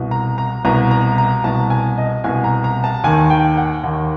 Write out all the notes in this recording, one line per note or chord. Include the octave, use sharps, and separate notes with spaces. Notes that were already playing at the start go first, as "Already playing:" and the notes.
Already playing: C2 B2
A#5
A#5
C2 B2 A#5
A#5
A#5
C2 B2 A5
G#5
D#5
C2 B2 G#5
A#5
A#5
A5
D#2 D#3 G#5
G5
F#5
D#2 D#3 F#5